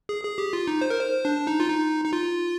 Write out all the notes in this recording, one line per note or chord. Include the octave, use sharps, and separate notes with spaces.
G#4
G#4
G4
F4
D#4
C5
A#4
C5
D4
D#4
F4
D#4
D#4
F4